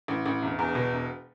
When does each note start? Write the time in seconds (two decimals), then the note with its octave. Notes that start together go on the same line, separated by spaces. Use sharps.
0.08 A1
0.26 A1
0.42 E1
0.59 E2
0.75 B2
0.92 E1